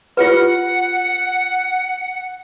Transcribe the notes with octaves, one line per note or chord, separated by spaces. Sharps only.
F4 G4 B4 F#5